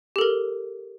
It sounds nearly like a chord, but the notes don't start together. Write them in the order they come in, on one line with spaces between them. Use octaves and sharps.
G4 A4 A#4